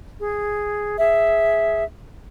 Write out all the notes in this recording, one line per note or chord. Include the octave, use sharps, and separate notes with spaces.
G#4
G#4 E5